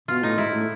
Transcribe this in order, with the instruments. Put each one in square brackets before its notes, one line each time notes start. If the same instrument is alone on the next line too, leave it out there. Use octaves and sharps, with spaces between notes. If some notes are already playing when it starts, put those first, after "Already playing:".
[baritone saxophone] B2 [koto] F4
[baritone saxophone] A2 [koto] D#4
[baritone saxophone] G#2 [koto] E4
[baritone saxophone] A2